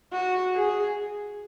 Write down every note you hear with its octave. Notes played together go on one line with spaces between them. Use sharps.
F#4
G#4